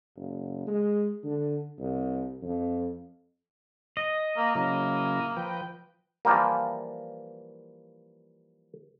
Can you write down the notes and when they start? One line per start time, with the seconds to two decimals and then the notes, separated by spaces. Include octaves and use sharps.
0.16 F#1
0.67 G#3
1.23 D3
1.79 C2
2.42 F2
3.97 D#5
4.37 A#3
4.55 C#3 F#3 A#3 E4
5.37 F3 B4 G5
6.25 E3 F3 G3 A#3